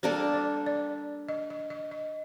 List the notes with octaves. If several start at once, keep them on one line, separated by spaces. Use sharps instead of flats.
G3 A#3 D4 A4 C5
D5
D5
D#5
D#5
D#5
D#5